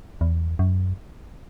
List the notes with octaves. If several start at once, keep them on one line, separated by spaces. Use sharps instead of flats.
E2
F#2